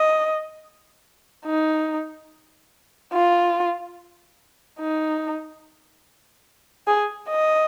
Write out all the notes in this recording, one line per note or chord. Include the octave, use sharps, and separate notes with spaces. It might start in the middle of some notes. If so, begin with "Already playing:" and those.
Already playing: D#5
D#4
F4
D#4
G#4
D#5